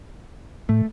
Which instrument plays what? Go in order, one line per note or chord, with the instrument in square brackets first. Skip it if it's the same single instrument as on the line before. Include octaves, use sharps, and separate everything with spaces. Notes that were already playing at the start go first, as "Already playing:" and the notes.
[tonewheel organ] A2 [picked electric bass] A3